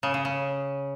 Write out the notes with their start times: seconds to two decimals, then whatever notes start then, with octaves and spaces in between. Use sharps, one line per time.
0.03 C#3
0.14 C#3
0.25 C#3